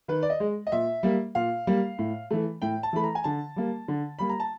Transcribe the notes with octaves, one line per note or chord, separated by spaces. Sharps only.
D#3 B4
D5
D#5
G#3
D#5
A#2 E5
G3 A#3
A#2 F5
G3 A#3
A2
E3 A3
A2 G5
A5
E3 A3 B5
A#5
G#5
D3 A5
G3 A#3
D3
G3 A#3 B5
A#5
A5